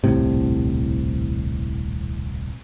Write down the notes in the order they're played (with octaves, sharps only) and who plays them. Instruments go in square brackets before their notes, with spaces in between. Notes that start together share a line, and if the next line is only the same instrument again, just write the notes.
[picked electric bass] D#1 C2 A2 C3